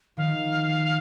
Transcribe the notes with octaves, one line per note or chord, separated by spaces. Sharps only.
D#3 F3 F5